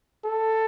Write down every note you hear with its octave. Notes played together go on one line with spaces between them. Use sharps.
A4